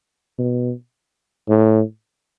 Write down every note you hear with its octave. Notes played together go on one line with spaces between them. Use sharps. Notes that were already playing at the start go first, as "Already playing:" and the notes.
B2
A2